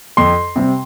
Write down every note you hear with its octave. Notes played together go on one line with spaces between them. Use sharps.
F2 C6
C3 G3 C4